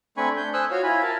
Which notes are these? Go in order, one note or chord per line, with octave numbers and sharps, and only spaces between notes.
A3 C4 D4 G#5 B5 C#6
D4 G6
C5 G#5 D#6 E6 F#6
F4 F#4 C#5 F5
E4 F4 G#5 B5
A#4 A5